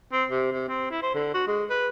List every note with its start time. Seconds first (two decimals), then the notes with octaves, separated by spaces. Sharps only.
0.13 C4
0.30 C3
0.52 C3
0.68 C4
0.91 E4
1.03 C5
1.15 D3
1.34 F#4
1.47 G#3
1.70 B4